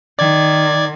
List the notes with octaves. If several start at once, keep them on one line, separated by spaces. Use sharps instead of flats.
D#3 D5 G#6